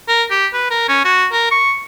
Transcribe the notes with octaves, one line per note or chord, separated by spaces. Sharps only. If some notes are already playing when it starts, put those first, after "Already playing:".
A#4
G4
B4
A#4
C#4
F#4
A#4
C#6